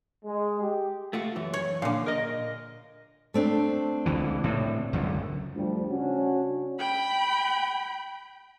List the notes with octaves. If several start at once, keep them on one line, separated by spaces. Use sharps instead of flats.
G#3
G4
A3 F4 F#4
F#2 E3
C#5
A#2 D3 F5
A#4 D#5
A3 C4 D4
C#2 D3 E3
A2 C3
C#2 F#2 D3
D2 F3 G3
C#3 C#4 D4 F#4
G5 B5